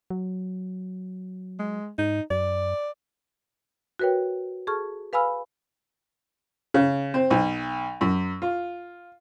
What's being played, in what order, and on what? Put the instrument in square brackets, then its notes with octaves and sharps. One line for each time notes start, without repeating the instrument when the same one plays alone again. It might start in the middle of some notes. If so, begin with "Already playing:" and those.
[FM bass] F#3
[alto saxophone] G#3
[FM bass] G#2 [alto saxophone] D#4
[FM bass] F#2 [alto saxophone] D5
[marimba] F#4 A#4 B4 C#5 G5
G#4 A4 A5 C#6 F6
B4 F5 G#5 B5 E6 F6
[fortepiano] C#3
C4
B1
F#2
F4